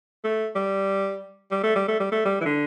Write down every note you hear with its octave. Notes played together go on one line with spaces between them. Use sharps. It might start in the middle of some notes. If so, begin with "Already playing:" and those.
A3
G3
G3
A3
G3
A3
G3
A3
G3
E3
D3